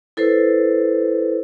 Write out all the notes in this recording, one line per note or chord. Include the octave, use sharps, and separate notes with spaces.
E4 A4 B4 C5